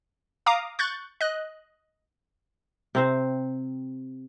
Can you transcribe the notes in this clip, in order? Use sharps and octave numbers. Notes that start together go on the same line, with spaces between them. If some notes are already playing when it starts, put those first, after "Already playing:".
F5 A#5 D6 D#6
C#6 F#6 G6 A6
D#5 F#6
C3 C4 C5